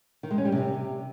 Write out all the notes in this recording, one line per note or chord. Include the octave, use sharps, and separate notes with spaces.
D#3
G#3
C#4
G3
C3